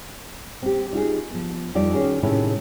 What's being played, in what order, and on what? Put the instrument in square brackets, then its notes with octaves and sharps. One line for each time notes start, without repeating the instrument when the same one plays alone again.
[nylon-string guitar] C4 G4
D#4 F4 F#4 G#4
F3 B3
F2 G3 D#4 F4 D5
D#3 C#4 F#4 G#4
A2 C3 D#3 G#3 C#4 E4